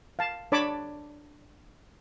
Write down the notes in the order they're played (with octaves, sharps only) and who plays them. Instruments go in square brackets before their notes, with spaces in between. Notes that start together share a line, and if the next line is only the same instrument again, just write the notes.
[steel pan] F5 A5
D4 C#5 D5 A5 B5 D6